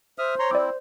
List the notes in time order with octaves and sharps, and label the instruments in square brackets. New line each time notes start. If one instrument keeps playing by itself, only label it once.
[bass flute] C5 [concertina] E5 D#6 F6
[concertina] C#5 A#5 C6
[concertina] C4 E4 [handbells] D5 D6